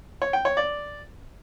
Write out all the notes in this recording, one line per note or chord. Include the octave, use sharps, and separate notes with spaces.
C#5
G5
C#5
D5